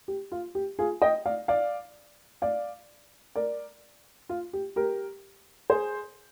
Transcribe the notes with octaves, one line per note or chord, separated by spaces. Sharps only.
G4
F4
G4
F4 G#4
D#5 G5
D5 F5
D5 F5
D5 F5
A#4 D5
F4
G4
G4 A#4
G#4 C5